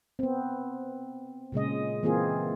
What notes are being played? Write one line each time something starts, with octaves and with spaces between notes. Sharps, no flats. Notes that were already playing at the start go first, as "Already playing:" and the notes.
B3 C4
A#2 C#3 G#3 D#5
E3 A#3 C4 F4 G#4